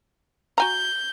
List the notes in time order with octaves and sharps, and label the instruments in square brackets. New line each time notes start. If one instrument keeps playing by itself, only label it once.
[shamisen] F#4 G#5 A#5 [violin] G6